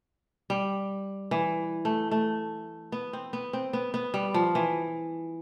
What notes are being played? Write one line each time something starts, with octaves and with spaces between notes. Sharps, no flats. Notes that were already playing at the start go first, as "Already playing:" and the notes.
G3
E3
A3
A3
B3
C4
B3
C4
B3
B3
G3
F3
E3